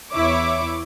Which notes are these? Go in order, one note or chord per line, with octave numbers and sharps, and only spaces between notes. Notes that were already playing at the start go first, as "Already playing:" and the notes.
E2 E4 C#5 D6